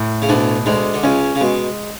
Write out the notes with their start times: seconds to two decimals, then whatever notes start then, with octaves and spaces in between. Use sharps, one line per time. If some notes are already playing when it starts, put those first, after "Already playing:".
Already playing: A2
0.22 C#3
0.29 D2 B2 D3
0.66 D2 D3 G#3
0.94 D3
1.03 C#2 C#3 C#4
1.35 C#3
1.41 B2 G#3